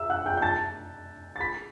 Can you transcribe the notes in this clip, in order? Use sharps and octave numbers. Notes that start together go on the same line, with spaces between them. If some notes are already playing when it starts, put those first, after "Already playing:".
Already playing: E5 E6
F#5 F#6
G5 G6
G6
A5 A6
A6
B5 B6